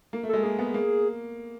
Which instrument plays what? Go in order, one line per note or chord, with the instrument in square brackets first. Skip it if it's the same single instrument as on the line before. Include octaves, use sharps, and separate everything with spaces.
[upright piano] A#3
A3
[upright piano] G#3 [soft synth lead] A4
[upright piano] A#3 [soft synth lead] G#4
[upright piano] B3
A#3